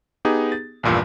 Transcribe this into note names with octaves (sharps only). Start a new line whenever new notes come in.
B3 D#4 G4 G#4
A6
A#1 E2 G2 A#2